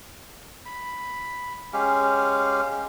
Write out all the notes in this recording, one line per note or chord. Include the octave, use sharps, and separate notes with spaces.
B5
G#3 C#4 G4 F5